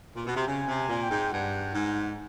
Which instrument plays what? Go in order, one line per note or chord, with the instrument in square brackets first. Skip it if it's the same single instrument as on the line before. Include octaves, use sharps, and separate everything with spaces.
[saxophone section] A#2
B2
C3
[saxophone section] C#3 [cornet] G#5
[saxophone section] C3
[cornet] G#5
[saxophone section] A#2
[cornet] G5
[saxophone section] G#2
[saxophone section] G2 [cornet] F#5
[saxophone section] G#2